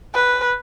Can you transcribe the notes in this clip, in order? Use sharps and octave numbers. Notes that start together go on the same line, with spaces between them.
B4